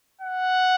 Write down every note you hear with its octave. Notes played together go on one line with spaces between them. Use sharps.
F#5